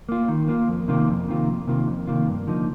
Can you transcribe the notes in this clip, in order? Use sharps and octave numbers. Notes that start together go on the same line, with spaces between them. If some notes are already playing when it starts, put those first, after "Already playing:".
A#3 F4
D#3
A#3 F4
F2
C3 D#3 A#3 F4
F2
C3 D#3 A#3 F4
F2
C3 D#3 A#3 F4
F2
C3 D#3 A#3 F4
G2
D3 F3 A#3 D#4